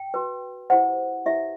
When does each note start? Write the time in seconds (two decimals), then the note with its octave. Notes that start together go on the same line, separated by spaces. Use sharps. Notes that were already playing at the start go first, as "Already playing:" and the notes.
Already playing: G5
0.14 F#4 B4
0.70 E4 G4 C5 F#5
1.26 E4 G4 B4 E5